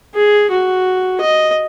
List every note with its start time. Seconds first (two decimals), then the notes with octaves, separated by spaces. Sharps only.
0.14 G#4
0.51 F#4
1.21 D#5